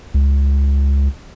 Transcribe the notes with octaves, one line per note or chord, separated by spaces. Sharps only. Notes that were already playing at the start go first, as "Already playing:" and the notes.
C#2